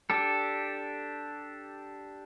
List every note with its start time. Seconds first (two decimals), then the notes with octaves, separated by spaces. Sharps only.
0.10 D4 G4 A4